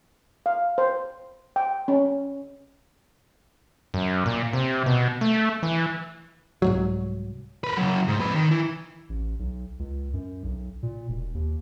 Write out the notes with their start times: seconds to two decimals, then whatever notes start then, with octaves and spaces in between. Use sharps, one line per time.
0.46 F5
0.78 C5
1.56 G5
1.88 C#4
3.94 F#2
4.26 A#2
4.53 C3
4.86 B2
5.21 A3
5.63 E3
6.62 C2 G#2 F#3
7.64 A#4 B4
7.77 C#3 F#3
8.08 G#2
8.20 F2 B4
8.35 D#3
8.51 E3
9.09 A1
9.39 B1
9.79 C#2
10.13 F#2
10.43 B1
10.83 A#2
11.09 E1
11.34 D#2